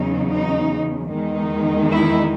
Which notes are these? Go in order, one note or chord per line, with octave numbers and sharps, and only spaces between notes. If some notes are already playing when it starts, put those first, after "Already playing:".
Already playing: E2 C#3 F#3 B3 D#4
D#4
E2 D#3 G#3 D#4
E4